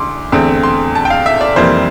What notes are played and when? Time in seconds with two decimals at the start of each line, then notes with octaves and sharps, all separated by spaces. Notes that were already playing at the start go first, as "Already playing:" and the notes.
Already playing: D2 C6 D6
0.32 E2 D3 A3 C4
0.63 C6
0.95 A5
1.05 G5
1.10 F5
1.26 E5
1.41 D5
1.56 F1 F2 E3 G3 A#3 C5